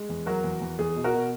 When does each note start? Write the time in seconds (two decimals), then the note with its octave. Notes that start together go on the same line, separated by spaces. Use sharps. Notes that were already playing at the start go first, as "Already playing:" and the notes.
Already playing: G#3
0.09 E2
0.26 F#3 F#4 A#4
0.44 E2
0.61 E2
0.79 E2 G#4
0.96 B2
1.04 F#4 A#4
1.13 B2